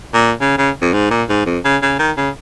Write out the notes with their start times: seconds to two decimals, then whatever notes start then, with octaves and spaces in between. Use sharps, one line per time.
0.14 A#2
0.41 C#3
0.58 C#3
0.81 F2
0.93 G#2
1.11 A#2
1.29 G#2
1.46 F2
1.65 C#3
1.82 C#3
1.99 D#3
2.17 C#3